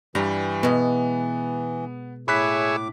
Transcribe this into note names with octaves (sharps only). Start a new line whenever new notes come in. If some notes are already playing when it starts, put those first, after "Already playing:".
G2 E3 G3 A#5
B2 G#3 B3
A2 G#4 C#5 E5 B5 D6 F#6 B6